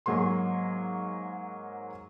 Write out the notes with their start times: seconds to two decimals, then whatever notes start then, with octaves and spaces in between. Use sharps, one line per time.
0.06 G#2 F#3 A#3 G#4 C6